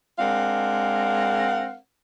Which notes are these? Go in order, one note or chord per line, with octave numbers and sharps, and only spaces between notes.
G#3 C4 D4 A#4 F5 F#5